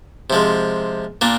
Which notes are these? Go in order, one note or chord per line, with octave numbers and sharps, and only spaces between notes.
C3 F3 G#3
A#2 A#3 D4